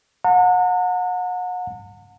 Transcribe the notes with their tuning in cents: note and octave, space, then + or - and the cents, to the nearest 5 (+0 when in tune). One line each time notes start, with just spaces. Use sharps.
F#5 -35 A#5 -45